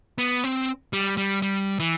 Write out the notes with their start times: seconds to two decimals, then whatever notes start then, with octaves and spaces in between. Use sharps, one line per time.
0.18 B3
0.44 C4
0.93 G3
1.17 G3
1.42 G3
1.80 E3